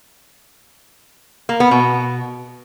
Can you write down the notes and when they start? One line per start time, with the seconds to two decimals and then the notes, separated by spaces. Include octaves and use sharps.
1.49 A#3
1.60 B3
1.71 B2